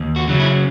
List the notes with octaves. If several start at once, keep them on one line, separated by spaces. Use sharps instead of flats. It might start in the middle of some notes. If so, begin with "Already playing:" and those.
Already playing: D#2
F#4
C#3 F#3 C#4
E4